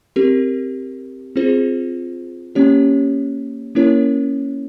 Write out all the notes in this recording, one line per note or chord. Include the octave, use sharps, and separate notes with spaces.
C4 G4 A#4
C4 F4 G#4 C5
A#3 C#4 G4 C#5
A#3 C#4 E4 A#4 C#5